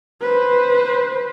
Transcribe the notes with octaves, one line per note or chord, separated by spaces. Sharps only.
B4 C5